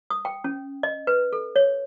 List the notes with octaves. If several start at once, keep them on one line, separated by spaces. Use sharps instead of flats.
D#6
G5
C#4
D#5
B4
A4
C#5